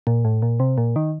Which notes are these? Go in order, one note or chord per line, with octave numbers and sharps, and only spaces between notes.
A#2
A2
A#2
C3
A#2
D#3